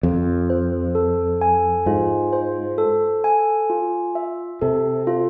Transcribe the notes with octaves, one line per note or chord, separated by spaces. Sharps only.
F2 F4
C5
A4
G#5
G#2 F4
C5
A4
G#5
F4
E5
C3 A4
F4